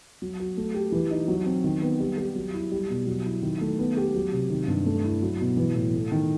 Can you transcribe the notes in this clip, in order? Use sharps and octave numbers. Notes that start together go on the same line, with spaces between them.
F#3
F#4
A3
G4
E3
D#4
F#3
C4
D#3
B3
G3
G4
F#3
E4
G3
B2
F#3
E4
D#3
A3
B3
G4
F#3
C3
D#3
G2
A3
E4
F#3
B2
E3
A2
A3
D#3